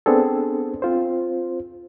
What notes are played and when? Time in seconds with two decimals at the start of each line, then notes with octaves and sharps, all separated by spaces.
0.06 B3 C4 D4 G#4 A4
0.82 C4 F4 C5